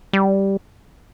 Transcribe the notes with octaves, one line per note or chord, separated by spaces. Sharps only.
G3